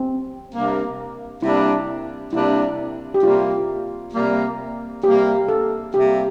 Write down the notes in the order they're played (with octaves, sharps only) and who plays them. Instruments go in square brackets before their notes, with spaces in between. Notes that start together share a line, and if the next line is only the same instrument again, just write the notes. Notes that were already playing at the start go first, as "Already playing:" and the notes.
Already playing: [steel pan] C4
[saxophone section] C3 G3 A#3 D4
[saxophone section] C3 G3 A#3 D4 [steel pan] E4
[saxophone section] C3 G3 A#3 D4 [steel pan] E4
[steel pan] G4
[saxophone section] C3 G3 A#3 [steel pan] F4
[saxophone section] C3 G3 A#3
[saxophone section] C3 G3 A#3 [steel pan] G4
[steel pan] A4
[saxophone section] C3 G3 A#3 [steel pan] G4